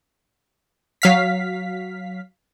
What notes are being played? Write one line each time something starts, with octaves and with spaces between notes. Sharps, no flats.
F#3 F5 B6